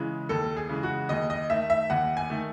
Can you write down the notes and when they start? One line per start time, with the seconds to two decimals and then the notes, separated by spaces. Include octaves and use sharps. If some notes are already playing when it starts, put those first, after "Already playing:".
Already playing: C#3 E3 G#3
0.29 D#2 A4
0.57 G#4
0.69 C#3 E3 G#3
0.83 F#4
1.09 D#2 D#5
1.30 D#5
1.50 D#3 A3 E5
1.70 E5
1.90 D#2 F#5
2.17 G#5
2.30 D#3 A3